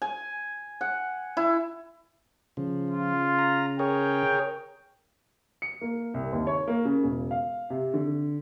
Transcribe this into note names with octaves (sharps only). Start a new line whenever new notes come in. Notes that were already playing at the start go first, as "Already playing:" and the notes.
G#5
F#5
E4
C#3 F3
F4
A#5
G#4 A#4 C#5 G5
C#7
A#3
C2
D#2
C#5
A#3
C#3
E1
F5
C3
D3